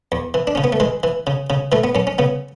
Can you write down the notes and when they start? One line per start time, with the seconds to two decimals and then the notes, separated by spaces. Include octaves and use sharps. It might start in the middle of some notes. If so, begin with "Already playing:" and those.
0.12 E2
0.34 E3
0.47 D4
0.55 C#3 C#4
0.64 B3
0.73 A3
0.80 E3 G#3
1.03 E3
1.27 C#3
1.50 C#3
1.72 E3 A3
1.84 B3
1.95 F#2 C#4
2.07 C#4
2.18 C#3 B3